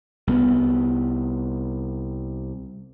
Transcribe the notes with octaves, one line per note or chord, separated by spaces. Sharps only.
C2 B3